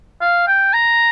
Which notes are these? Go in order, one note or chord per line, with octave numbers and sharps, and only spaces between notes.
F5
G5
A#5